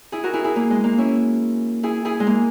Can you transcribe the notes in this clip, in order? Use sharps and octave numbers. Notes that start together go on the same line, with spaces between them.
E4 G#4
F#4 A#4
E4 G#4
E4 G#4
A#3
G#3
A#3
C#4 E4
E4 G#4
E4 G#4
G#3
A#3